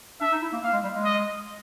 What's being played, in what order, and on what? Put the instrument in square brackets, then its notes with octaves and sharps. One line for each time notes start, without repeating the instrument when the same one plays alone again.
[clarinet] D4 [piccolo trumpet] E5
[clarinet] D#4
E4
A#3
[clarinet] A#3 [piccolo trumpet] F5
[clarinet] G#3
G3
G#3
[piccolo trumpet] D#5